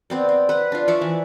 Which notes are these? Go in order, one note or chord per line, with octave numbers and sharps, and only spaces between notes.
B3 C4 D5
C4
B4 F#5
D4 F4
F3 D5 E5 C#6
E3